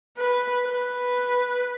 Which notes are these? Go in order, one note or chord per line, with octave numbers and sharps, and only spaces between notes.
B4
B4